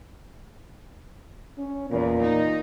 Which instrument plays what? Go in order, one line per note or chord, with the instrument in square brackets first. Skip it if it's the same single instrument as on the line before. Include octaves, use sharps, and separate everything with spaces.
[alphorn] C#4
[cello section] E2 [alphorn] A#2
[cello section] D#4